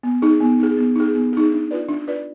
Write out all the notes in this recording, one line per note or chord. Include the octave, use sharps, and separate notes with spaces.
B3
D#4 G#4
B3
D#4 G#4
B3
D#4 G#4
B3
D#4 G#4
D4
F4 B4 D5
D4
F4 B4 D5